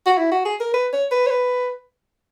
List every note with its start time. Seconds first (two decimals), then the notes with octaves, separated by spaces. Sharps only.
0.06 F#4
0.18 E4
0.32 F#4
0.45 G#4
0.60 A#4
0.74 B4
0.93 C#5
1.11 B4
1.27 C#5
1.30 B4